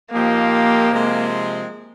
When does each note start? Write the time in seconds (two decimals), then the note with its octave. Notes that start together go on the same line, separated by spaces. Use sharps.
0.12 A#2 F3 A#3 C4 D#4 G4
0.90 C3 F3 G#3 C4